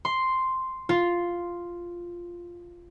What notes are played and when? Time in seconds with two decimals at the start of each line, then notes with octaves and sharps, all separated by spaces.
0.05 C6
0.89 F4